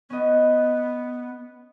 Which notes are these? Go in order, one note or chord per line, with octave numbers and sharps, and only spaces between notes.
B3 C#4 D#5